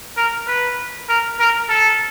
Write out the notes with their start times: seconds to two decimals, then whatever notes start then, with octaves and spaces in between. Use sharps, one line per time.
0.17 A#4
0.47 B4
1.09 A#4
1.39 A#4
1.69 A4